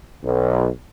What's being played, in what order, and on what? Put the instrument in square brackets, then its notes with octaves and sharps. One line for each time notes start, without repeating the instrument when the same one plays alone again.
[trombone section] B1